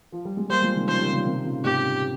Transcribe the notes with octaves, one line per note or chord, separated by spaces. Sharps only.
F3
G3
G#3
G3 A#3 C5
F3 G#3
C3 D#3
C#3 F3 C5
D#3 G3
C#3 F3
C3 D#3
A#2 C#3
G#2 C3 G4